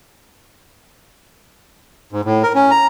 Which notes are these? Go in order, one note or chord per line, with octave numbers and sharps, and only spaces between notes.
G#2
A2
A#4
C#4
A#5